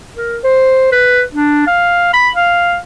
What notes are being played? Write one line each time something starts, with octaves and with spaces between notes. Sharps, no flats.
A#4
C5
B4
D4
F5
B5
F5